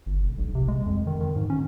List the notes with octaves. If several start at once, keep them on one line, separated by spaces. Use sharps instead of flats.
G1
E1
B1
C3
G#3
F2
D#3
D#3
G#2
C#4